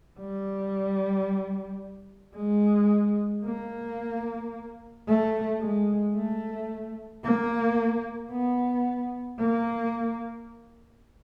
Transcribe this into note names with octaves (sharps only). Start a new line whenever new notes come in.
G3
G#3
A#3
A3
G#3
A3
A#3
B3
A#3